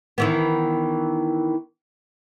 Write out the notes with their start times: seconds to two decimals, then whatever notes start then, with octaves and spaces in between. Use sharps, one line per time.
0.18 D#3 E3 B3